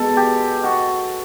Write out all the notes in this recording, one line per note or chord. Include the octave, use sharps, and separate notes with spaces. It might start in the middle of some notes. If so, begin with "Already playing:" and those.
Already playing: B2 G#3 A4
G4
F#4